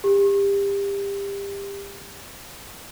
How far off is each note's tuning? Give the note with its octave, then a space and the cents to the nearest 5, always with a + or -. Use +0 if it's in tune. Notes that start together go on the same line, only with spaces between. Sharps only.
G4 +25